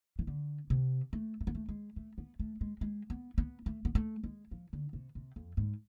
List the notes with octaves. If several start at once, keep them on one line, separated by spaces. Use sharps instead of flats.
E3
D3
C3
A3
A3
B3
A3
G#3
A3
B3
A3
G#3
G#3
B3
B3
A3
B3
A3
G#3
F3
D3
C3
C3
F2
G#2